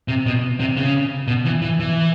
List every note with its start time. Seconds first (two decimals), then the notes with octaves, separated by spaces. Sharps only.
0.08 C3
0.26 B2
0.60 C3
0.77 C#3
1.28 B2
1.46 E3
1.62 E3
1.80 E3